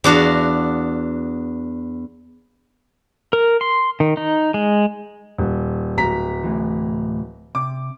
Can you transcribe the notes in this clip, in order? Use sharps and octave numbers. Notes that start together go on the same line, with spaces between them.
E2 D4 F#4 F5
A#4
C6
D#3
D#4
G#3
D#1
D1 A#5 B6
C2 A2 E3
C3 D6